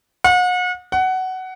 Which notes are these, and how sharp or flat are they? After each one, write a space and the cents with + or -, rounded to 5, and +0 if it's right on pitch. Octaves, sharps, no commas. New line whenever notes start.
F#5 -40
F#5 +15